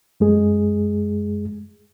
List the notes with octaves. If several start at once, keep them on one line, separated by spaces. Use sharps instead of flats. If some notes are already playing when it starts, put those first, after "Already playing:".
F#2 G#3 G#4